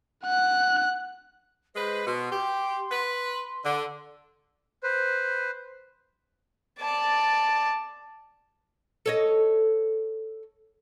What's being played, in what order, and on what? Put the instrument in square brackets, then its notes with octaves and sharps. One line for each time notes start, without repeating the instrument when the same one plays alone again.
[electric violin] F#5 F#6
[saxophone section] G#3 B4 [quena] C5
[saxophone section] B2 [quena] C6
[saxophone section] G4
B4
D3
[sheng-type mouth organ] B4 C5
[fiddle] D5 A5
[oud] A4 C#5 D#5